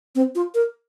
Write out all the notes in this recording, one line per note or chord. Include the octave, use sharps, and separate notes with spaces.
C4
F4
A#4